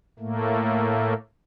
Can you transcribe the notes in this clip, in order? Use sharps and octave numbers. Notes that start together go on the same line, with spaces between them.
A2 A3 A#3